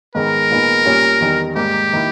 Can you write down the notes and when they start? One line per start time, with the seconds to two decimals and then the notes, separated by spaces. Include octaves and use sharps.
0.15 G#2 D#3 G#3 B3 A#4
0.51 A#2 G#3 B3 D#4
0.85 A#2 G3 C#4
1.20 E2 D#3 G3
1.55 G#2 G3 A#3 G4
1.93 D#3 A#3 E4